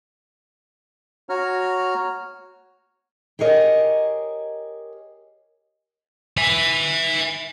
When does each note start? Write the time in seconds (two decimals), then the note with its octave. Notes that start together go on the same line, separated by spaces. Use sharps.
1.29 F#4 C#5 A#5 F6
3.39 G4 G#4 A#4 C#5 D#5
6.37 E5 G#5